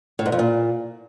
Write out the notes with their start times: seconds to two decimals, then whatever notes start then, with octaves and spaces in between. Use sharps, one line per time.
0.19 A2
0.26 G#2
0.32 F2
0.39 A#2